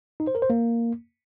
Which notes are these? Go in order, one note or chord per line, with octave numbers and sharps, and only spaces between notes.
D#4
C5
A#4
C5
A#3